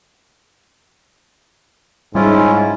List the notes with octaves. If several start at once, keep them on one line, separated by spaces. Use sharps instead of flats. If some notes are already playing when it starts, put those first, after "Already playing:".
G#2 G3 C#4 E4 F4